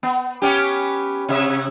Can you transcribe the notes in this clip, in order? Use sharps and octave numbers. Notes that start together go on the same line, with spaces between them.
B3
B3 C#4 G4
C3 E5